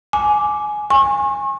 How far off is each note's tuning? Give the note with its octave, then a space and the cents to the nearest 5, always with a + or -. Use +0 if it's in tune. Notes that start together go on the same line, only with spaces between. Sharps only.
G#5 +15 D6 +0
G#5 -15 C#6 -40